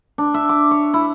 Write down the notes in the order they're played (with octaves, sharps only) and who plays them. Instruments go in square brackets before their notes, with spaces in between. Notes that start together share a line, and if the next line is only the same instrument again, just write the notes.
[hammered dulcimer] D4
E5
D6
C#5
E4